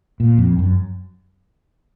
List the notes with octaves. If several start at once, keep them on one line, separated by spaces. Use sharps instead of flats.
A#2
F2
F#2